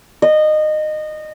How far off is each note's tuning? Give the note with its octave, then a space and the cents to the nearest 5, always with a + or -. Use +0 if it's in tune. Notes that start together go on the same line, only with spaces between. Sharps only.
D#5 -20